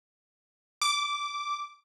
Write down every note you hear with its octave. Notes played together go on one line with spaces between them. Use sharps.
D6